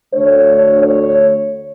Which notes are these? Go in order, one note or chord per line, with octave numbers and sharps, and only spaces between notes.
D2 D3 A3 D4 C#5
C#5